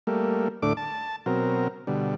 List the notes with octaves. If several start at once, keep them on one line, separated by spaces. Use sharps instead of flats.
G3 A3 A#3
D2 A2 A3 D4 D6
A5
B2 F#3 C4 A#4
B2 D3 G3